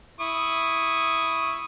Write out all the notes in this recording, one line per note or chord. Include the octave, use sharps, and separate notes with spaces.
E4 C#6 D#6